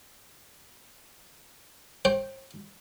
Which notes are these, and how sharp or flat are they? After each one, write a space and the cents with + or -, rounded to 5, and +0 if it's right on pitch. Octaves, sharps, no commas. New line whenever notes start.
C5 +40 G5 +0